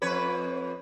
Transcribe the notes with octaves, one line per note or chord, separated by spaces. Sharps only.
F2 B4 C#5